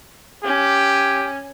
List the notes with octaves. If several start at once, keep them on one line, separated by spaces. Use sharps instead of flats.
C#4 G4